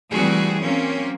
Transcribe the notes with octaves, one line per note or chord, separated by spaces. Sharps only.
E3 G3 A3 C4 F#4 G#4
F#3 A#3 C4 C#4